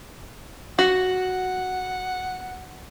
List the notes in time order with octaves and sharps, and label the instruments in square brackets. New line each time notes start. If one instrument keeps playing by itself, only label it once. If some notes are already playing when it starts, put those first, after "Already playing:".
[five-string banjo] F#4 [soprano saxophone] F#5